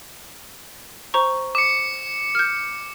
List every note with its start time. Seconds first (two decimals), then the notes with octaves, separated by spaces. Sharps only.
1.14 C5 A#5 C#6
1.55 D6 C#7
2.35 F6 G6